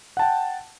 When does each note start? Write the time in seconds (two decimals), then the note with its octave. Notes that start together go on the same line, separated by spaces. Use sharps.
0.17 F#5
0.19 A5
0.22 G5